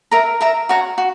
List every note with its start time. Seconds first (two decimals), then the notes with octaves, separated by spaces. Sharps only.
0.11 A#4 E5 A#5
0.41 A#4 E5 A#5
0.69 F#4 C#5 F#5 A#5
0.98 F#4